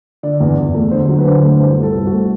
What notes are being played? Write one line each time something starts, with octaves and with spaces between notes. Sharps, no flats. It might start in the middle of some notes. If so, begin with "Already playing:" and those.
D3 D5
E2
E2
A3
D3 C5
F#3
B4
D3 C5
A3
B4
C2 C5
C2
A4
C2
F#4
A3